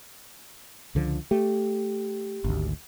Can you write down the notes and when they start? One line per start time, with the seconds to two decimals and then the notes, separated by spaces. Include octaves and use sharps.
0.95 C#2 D3 F3
1.31 A3 G4
2.44 G#1 D2